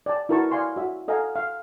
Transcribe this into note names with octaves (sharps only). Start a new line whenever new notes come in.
D5 G5 A5
E4 F#4 A#4 B4 A5 C#6
D5 F5 G#5 C6 C#6
F#4 E5
A4 D#5 F5 F#5 G#5 A#5
F5